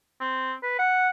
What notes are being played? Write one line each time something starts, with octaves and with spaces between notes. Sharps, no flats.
C4
B4
F#5